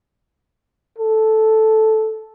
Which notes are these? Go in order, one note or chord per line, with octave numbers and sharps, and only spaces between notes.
A4